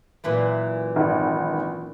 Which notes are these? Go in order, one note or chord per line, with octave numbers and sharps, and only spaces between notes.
F#2 A#2 E3
G#1